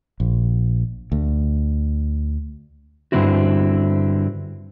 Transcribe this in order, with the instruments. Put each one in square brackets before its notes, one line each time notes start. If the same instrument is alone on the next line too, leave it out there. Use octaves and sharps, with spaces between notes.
[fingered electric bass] A#1
D2
[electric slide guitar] G2 D3 D#3 C4 E4 F#4